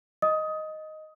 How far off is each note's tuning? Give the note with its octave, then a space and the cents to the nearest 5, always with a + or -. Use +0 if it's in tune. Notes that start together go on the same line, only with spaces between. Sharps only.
D#5 +0 D#6 +20